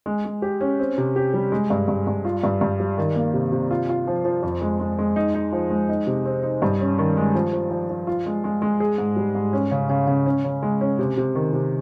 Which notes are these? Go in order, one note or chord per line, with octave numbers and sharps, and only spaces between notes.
G#3
G#3
G4
C#4
C4
C3
G4
G3
G#3
G2
G2
G2
F4
G2
G2
G3
D#3
A#3
C3
C3
F4
F4
F3
F3
F2
G#3
G#3
G#3
D#4
D#4
F3
G#3
D#4
C3
C4
D#4
G2
C#4
D#3
G#3
F3
F3
F3
F3
F4
G#3
G#3
G#3
G#4
G#2
G3
G#2
C#4
C#3
C#3
C#3
C#4
C#3
G#3
C#4
C3
C3
D#3
C3